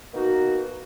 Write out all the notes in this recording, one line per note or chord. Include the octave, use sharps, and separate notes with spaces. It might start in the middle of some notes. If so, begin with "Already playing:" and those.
B2 A#3 D#4 F#4